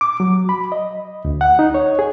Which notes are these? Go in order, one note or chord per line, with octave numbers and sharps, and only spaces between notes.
D6
F#3
B5
D#5
D2
F#5
D#4
C#5
G#4